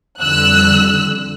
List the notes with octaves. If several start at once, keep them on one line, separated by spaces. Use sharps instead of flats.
F2 D3 G3 E6 F#6